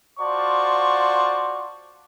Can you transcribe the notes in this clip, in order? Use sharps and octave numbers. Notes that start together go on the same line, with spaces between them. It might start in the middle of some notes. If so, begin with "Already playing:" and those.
F4 F#4 C5 D5 A5 C#6